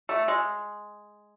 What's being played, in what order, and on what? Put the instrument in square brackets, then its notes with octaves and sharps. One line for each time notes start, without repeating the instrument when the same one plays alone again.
[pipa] A3
G#3